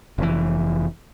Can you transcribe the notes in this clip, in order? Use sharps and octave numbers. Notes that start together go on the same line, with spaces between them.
F1 E3